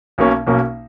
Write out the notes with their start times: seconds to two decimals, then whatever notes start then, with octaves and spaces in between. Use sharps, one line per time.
0.18 B1 B2 A#3 C#4
0.47 B1 B2 A#3 C#4